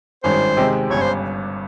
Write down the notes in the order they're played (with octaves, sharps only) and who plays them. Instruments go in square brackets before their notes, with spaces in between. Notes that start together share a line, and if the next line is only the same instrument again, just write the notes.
[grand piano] G#1 G2 D#3 G#3 C#4 [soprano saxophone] C5
[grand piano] C3 D#3 G#3 C4 G4
[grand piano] G1 G2 G3 C#4 [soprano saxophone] C#5
[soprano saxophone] C5